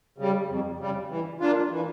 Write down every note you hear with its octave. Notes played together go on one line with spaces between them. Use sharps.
C#3 G3
F2
C#3 G3
E3
A#3 D4 F4
E3